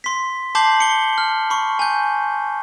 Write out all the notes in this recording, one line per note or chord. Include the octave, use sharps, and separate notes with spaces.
C6 B6
A5 C6 D6 G6 C7 F#7
C#7 G7
F6
B5 C#6
G#5 G6